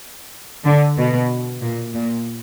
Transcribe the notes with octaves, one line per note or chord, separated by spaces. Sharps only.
D3
B2
A#2
A#2